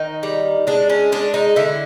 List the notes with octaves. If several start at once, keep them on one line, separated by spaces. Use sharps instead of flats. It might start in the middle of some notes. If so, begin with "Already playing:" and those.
Already playing: D#3 D#4
G3
G#3 D4
C#4
G#3 D4
D#4
D3 E4